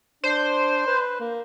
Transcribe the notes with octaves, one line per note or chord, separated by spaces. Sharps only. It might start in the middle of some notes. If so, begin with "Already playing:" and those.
D4 C5
B4
A#3